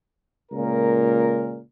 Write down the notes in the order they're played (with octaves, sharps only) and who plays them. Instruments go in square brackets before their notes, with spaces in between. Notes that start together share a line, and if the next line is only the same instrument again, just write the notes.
[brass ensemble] C#2 A#2 A#4